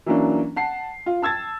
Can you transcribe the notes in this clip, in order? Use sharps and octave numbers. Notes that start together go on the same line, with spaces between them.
E3 F#3 A#3 C#4 D4
F#5 A5 C7
F4
A5 E6 G#6 A6